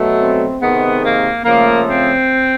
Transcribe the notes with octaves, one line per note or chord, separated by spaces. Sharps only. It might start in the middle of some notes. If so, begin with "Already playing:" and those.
Already playing: B2 F#3 A3
C4
C3 D#3 G#3 B3
A#3
C#3 F3 A3 A#3
C4